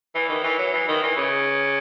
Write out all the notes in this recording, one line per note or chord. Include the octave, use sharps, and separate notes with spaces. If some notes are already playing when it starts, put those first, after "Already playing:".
E3
D#3
E3
F#3
E3
D#3
E3
C#3